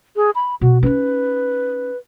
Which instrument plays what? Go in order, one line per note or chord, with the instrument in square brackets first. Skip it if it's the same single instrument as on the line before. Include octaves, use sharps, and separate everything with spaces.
[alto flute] G#4
B5
[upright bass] B2 [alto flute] F#4
[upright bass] C#4 D#4 [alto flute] B4